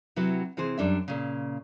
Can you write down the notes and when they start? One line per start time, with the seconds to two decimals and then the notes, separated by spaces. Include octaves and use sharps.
0.16 C3 F#3 E4 B4
0.57 C3 E3 G#4 C5
0.78 F#2 G3 D4 E5
1.08 A#2 C#3